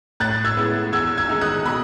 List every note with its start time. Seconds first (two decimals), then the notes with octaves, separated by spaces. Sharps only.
0.20 A2 F#6 A6
0.45 E6 G#6
0.57 G#3 B3 E4
0.92 E2 E6 G#6
1.17 E6 G#6
1.29 D#3 G#3 D#4
1.41 D#6 F#6
1.65 B2 B5 D#6